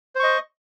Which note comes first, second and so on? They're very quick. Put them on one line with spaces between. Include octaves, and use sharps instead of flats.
C5 C#6 D#5